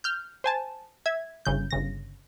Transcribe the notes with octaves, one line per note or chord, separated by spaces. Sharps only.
F6 G6
C5 G#5 A5
E5 G#6
G1 C#3 G6
G1 C#3 A#6